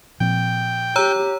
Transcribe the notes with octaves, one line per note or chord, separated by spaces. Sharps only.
A#2 F3 C4 G5
G4 C#5 A#5 E6